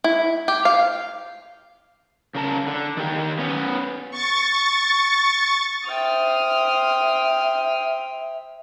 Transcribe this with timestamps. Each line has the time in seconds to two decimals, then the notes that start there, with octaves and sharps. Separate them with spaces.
0.04 E4
0.48 G4
0.65 F5
2.35 C#3 A#4 A5
2.67 D3
2.97 D#3 G4
3.39 B3 C#4
4.11 C#6 A6
5.88 C5 E5 G5 D#6 F6